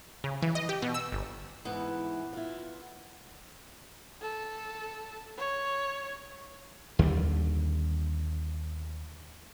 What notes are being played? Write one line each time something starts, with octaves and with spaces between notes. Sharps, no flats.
C#3
E3
D#5
G4
B2
E6
G1
G#2 E3 B3
E4 F4
A4
C#5
D#2 D3 D#3 G3